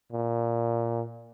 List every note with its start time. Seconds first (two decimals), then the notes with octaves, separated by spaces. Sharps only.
0.12 A#2